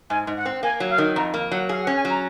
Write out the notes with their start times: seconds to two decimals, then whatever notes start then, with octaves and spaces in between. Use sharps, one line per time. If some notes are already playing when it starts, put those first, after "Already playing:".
0.10 G#2 G#5
0.27 G#2
0.36 F#5
0.46 C4
0.63 A#3 G#5
0.80 F#3
0.89 F5
0.98 D#3
1.16 F2 A#5
1.34 A#3
1.51 F#3 F#5
1.69 G#4 F5
1.82 F#5
1.87 C#4
1.96 G#5
2.05 F#3 A#5